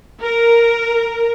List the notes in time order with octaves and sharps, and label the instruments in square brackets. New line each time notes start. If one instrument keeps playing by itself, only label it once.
[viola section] A#4